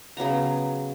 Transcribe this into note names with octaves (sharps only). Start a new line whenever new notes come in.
C#3 F#3 B3 A#5